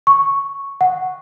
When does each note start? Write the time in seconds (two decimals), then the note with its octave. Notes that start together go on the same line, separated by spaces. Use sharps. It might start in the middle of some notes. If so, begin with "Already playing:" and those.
0.07 C#6
0.81 F#5